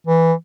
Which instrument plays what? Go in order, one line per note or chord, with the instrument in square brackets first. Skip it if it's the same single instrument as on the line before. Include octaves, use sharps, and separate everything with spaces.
[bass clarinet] E3